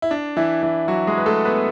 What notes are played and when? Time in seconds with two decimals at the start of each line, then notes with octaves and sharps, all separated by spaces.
0.02 E4
0.11 D4
0.37 E3 E4
0.63 E3 E4
0.88 F#3 F#4
1.07 G#3 G#4
1.18 B4
1.26 A3 A4
1.45 B3 B4